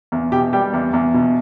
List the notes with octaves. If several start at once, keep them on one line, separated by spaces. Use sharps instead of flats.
E2
B2 G4
G3 G4
E2
E2
B2